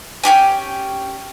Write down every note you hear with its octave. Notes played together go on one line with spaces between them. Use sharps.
C#4 F4 G4 G#5